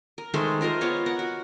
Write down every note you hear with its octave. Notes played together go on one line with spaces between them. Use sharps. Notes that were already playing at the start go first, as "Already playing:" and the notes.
A#4
D#3 G#3 A3 C5
F4 A#4 C5 D#5
B3 F4 C#5
A#4 F#5
F#4